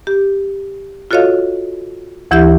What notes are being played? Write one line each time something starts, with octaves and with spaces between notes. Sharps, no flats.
G4
F4 F#4 A4 C#5 D#5 F5
D2 E3 E4 G4 E5 G6